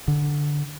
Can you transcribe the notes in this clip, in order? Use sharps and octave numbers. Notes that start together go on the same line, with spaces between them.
D3